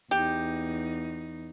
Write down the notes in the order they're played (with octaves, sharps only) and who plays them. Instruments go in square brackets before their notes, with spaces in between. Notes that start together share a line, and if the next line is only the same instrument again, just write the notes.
[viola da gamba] E2 D#4 [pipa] G4